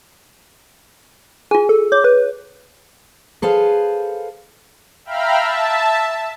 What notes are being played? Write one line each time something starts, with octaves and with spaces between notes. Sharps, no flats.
F4 G#4 G#5
A4
C#5 D6
B4
G#4 A4 B4 C5 F5
E5 F5 G5 A#5 B5 F6
E5 A5